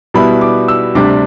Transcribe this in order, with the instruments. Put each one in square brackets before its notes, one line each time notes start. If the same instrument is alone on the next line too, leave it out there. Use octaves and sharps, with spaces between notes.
[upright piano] B2 G3 B3 E4 B5
D6
E6
D2 C3 G3 D4 D6